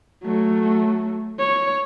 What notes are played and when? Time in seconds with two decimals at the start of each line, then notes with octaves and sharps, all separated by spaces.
0.24 F#3 A3
1.39 C#5